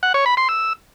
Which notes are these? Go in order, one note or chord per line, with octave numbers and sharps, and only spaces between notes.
F#5
C#5
B5
C6
E6